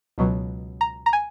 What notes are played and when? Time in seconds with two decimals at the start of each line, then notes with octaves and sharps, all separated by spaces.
0.18 C#2 B2 F#3
0.81 A#5
1.06 A#5
1.13 G#5